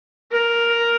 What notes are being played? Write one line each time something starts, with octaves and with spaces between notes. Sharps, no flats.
A#4